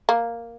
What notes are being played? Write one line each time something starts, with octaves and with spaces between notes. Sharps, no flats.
A#3